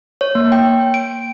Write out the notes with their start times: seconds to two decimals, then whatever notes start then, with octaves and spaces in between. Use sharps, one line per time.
0.21 C#5
0.35 A#3
0.52 G5
0.94 D7